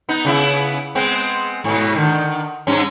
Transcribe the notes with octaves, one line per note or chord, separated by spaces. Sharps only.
B3 D#4
C#3 B3 E4
G#3 B3 C4
G#2 B2
D3 D#3
G2 C#4